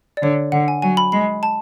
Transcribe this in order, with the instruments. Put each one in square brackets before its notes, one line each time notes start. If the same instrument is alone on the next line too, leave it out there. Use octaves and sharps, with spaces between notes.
[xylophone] D5
[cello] D3 [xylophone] C#5
[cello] D3 [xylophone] F#5
[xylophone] G#5
[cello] F#3 [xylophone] G#5
[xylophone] B5
[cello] G#3 [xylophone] B5
[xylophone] A5